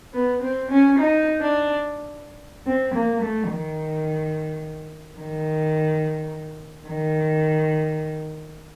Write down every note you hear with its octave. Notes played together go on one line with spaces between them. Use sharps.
B3
C4
C#4
D#4
D4
C4
A#3
A3
D#3
D#3
D#3